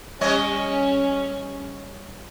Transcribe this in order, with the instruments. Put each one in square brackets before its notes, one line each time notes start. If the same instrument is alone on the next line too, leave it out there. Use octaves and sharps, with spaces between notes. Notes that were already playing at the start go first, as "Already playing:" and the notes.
[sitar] G3 C#5 D#5 [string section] C#4